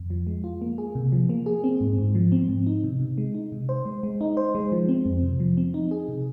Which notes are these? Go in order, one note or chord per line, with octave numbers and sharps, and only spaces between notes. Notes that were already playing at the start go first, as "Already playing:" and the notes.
Already playing: F2
F3
G#3
F4
A#3
G#4
C3
F3
A#3
G#4
C4
G#2
G#2
F3
C4
G#2
D#4
C3
C3
G#3
D#4
C3
C5
G#3
G#3
D#4
C5
G#3
F3
C4
F2
C3
F3
C4
D#4
G#4
C3